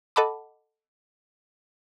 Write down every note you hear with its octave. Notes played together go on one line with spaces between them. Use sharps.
A4 D#5 F#5 A5 B5 D6